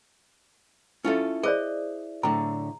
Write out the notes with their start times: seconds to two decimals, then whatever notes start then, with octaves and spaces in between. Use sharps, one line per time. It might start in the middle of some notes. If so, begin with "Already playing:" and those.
1.05 C#4 E4 F4 A4 E5
1.43 G#4 C5 D5 D#5
2.23 A2 D3 A#5